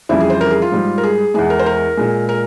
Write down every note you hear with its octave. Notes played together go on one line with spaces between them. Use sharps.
F2 C#3 E3 G3 E4
G#4
C5
A#4
G#4
F4
G#2 G3
A#4
G#4
E2 E3 G#3 G#4
A#4
C5
A#4
A#2 G#3
A#4